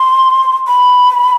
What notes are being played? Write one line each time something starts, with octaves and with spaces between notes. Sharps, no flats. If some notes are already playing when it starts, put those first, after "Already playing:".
Already playing: C6
B5